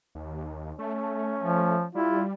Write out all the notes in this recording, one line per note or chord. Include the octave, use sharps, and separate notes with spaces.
D#2
A3 C#4
F3
G3 E4 F4